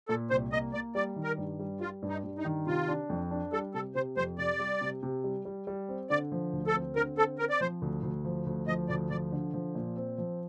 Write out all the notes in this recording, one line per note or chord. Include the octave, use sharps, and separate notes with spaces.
A#2 A4
C2 C5
A#3 D#5
A#3 D5
G3 D5
D#3
A#4
G2
G3
G3 F4
G2
D#4
G2
D#4
D#3
C3 F4
D4
F2
D4
G3 A4
C3 A4
C3 C5
F2 C5
C3 D5
G3
C3
C3
G3
G3
G3
C4
D3 D5
F3
D2
A4
C4
D3 A#4
C4 A4
C4 A#4
D5
F3 C5
D2
D2
F3
D2
F3 D#5
D2 D5
F3 D5
D3
F3
A#2
C4
F3